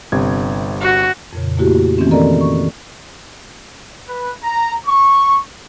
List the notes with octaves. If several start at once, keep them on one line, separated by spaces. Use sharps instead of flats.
G1 C3 G#6
F#4
F2 A#2 C#3
A3 A#3 E4 F#4 G4
D#3 E3 A3 A#3 C4 C#4
C4 A4 A#4 D5 D#5 A#5
C#6
B4
A#5
C#6